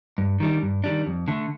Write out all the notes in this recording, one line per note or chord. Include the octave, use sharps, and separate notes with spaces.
G2
D#3 G3 D4
G2
D#3 G3 D4
F2
D3 A3